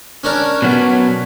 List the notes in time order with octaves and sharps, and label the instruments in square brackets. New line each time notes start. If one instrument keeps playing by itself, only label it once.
[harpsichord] C#4 D4 A#4
[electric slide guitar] B2 F#3 B3